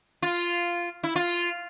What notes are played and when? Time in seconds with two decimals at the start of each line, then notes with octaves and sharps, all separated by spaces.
0.22 F4
1.03 E4
1.16 F4